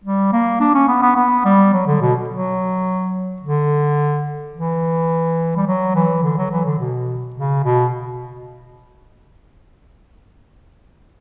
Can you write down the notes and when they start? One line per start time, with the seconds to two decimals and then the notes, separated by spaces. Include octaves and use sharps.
0.04 G3
0.32 A#3
0.60 D4
0.74 C#4
0.88 B3
1.02 B3
1.16 B3
1.45 G3
1.73 F#3
1.87 D3
2.01 B2
2.29 F#3
3.42 D3
4.54 E3
5.56 G3
5.67 F#3
5.95 E3
6.23 D3
6.37 F#3
6.51 E3
6.65 D3
6.79 B2
7.35 C#3
7.64 B2